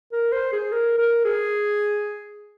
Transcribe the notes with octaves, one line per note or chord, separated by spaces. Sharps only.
A#4
C5
G#4
A#4
A#4
G#4